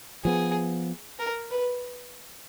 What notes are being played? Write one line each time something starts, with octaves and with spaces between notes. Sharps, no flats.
F3 B3 G#4
A#4
B4